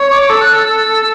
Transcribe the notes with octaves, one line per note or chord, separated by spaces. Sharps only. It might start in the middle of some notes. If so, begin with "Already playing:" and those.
Already playing: C#5
D6
A4 E6
F#6
E6